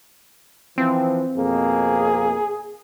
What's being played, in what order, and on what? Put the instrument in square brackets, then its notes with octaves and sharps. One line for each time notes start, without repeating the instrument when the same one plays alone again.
[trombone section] E3 F3 [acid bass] C4
[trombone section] F2 B2 A#3 [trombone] G#4